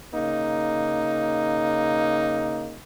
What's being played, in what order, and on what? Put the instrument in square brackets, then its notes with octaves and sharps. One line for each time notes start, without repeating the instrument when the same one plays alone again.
[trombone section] C#3 A#3 D#4